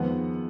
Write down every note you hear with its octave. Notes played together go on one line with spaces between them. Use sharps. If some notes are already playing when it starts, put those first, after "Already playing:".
Already playing: F2 D#3 G#3 B3 F#5